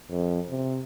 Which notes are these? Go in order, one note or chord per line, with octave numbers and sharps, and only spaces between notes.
F2
C3